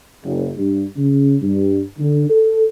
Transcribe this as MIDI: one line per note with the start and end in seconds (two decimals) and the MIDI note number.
0.24 0.49 30
0.57 0.84 43
0.96 1.35 49
1.42 1.81 43
1.99 2.26 50
2.30 2.64 69